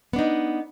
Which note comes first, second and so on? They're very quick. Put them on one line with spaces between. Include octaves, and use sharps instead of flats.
B3 D4 D#4